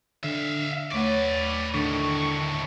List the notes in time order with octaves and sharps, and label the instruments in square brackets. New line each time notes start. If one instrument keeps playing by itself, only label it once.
[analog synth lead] D3 [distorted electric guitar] E5 F5
[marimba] D#2 A3 F#5 [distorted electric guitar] B4 D5 [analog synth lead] C#5
[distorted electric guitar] A2 D#3 [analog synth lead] D3 [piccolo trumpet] C#6